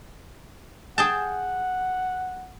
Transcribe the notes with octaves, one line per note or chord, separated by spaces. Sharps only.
G#4 F#5 G5 A5